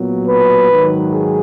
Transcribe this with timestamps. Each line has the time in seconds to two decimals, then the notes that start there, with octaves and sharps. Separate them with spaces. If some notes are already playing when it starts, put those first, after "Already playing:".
Already playing: A#2 F#3 B3
0.28 B4
0.70 G#2 D#3 F#3
1.12 G#4